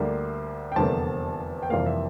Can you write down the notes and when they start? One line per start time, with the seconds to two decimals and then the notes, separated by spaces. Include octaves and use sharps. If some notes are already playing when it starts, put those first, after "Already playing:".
Already playing: D2 D3 G3 A#3
0.72 G5
0.76 F1 E2 D3 G3 A#3 A5
1.63 G5
1.70 F1 F2 E3 G3 A#3 F5
1.86 E5